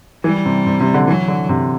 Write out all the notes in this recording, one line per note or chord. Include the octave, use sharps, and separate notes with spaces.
E3 G3
C3
C3
C3
D3
E3 F#3
D3
C3